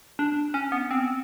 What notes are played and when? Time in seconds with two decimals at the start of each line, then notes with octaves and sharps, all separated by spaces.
0.19 D4
0.54 C#4
0.72 B3
0.91 C4